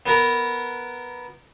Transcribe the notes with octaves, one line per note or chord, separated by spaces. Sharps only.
B3 A#4